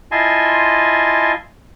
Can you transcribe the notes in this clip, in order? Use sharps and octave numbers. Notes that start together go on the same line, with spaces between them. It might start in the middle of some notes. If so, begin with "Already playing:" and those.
E4 F4 D#5 G#5 A5 C6